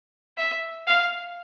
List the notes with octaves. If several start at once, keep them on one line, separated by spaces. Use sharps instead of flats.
E5
F5